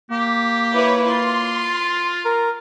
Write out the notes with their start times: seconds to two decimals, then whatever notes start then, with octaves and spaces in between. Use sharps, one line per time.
0.11 A#3 G4
0.74 E4 B4 C#5
1.10 F4 C6
2.25 A#4